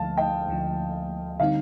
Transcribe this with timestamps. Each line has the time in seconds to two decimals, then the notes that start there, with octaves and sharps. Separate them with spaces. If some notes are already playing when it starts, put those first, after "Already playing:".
Already playing: D2 D3 F3 F5 A5
0.18 D#5 G5
0.48 D2 D3 F3
1.40 D3 G3 C4 D#4 F5